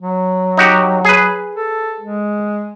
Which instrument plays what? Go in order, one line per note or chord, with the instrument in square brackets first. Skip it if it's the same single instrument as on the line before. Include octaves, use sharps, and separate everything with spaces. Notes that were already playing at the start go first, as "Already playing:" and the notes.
[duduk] F#3
[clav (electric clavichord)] D#4 F#4 G4
G#4 B4
[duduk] A4
G#3